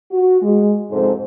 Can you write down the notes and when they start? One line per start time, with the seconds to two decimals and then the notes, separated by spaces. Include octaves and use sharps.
0.11 F#4
0.42 G#3
0.91 F2 G#2 C3 C4 A4 C5